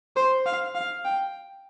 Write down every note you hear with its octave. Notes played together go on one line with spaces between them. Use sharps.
C5
F5
F5
G5